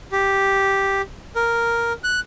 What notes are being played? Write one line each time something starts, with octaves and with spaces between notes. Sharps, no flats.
G4
A#4
F#6